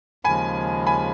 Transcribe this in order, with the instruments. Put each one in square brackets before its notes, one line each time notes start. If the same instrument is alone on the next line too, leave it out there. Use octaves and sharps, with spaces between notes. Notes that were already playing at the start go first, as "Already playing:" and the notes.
[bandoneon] D#2 C#3 F3 G#3 [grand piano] G#5 B5
[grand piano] G#5 B5